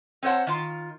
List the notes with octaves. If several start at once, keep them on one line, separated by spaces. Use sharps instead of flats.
C4 C5 C#5 F#5 A5
D#3 F4